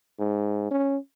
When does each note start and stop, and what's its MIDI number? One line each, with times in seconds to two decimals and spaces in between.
0.19 0.71 44
0.71 0.97 61